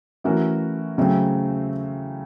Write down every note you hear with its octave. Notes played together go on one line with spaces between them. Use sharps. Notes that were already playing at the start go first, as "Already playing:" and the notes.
E3 A3 C#4 F#4 A#4
C#3 F#3 A3 C4